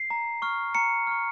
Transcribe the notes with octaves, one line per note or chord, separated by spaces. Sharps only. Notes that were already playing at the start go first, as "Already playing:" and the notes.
Already playing: C7
A#5
C#6 F6
A#5 C#7
C#6 F6